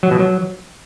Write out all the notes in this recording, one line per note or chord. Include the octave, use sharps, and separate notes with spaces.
F#3
B2
F#3